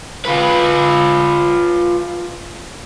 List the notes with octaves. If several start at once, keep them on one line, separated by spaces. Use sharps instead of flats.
F4 B4